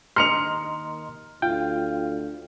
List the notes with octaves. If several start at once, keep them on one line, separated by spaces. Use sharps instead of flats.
D#2 D#5 A#5 C6 F6 C#7 F7
D2 F4 G5